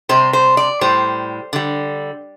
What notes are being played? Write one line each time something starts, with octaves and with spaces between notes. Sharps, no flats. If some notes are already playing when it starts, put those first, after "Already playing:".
C3 G3 C5
C5
D5
A2 G3 C5
D3 G3